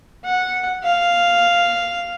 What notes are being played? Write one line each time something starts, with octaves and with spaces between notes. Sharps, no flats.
F#5
F5